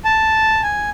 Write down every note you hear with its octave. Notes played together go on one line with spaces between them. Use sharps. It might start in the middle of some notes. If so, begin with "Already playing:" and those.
A5
G#5